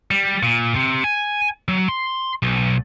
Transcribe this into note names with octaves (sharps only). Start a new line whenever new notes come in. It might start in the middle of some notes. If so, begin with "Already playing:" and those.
G3
A#2
C3
G#5
F#3
C6
B1